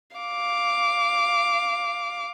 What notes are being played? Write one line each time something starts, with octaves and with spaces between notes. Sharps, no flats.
F5 D6